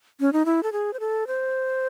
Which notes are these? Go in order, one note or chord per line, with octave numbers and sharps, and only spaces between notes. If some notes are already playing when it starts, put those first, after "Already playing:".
C#4
D#4
E4
A4
G#4
C5
A4
C5